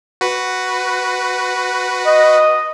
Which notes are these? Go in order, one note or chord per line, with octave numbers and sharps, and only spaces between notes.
F#4 B4
D#5